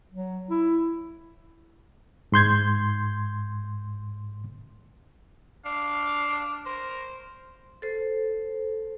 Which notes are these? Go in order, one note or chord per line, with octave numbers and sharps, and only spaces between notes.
F#3
E4
G#2 C6 G6 G#6
D4 F5
A#4 C5
A4 C5